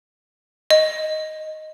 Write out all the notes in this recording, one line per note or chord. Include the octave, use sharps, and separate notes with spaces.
D#5